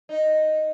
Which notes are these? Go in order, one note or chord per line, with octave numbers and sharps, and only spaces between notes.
D#4